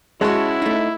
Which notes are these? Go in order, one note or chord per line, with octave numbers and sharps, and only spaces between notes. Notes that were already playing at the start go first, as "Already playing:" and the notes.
G#3 C#4 E4 F#4 F#5 A5
A3 D#4